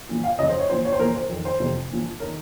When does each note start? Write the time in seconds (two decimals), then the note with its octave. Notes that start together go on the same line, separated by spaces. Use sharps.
0.09 A#2 F3
0.24 F5
0.39 F2 C#3 F3 D#5
0.49 C5
0.59 C#5
0.69 A#2 F3 C5
0.85 C#5
0.92 C5
0.99 A#2 F3 A#4
1.15 C5
1.30 F2 D#3
1.45 C5
1.60 F2 C3 F3
1.90 A#2 F3
2.20 A#4
2.23 D#3